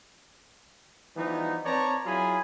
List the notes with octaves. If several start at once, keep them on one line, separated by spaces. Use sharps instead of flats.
E3 F3 G3 B3 D#4
C4 B4 C#5 D5 A5 A#5
F#3 E4 F4 G#4 G#5 B5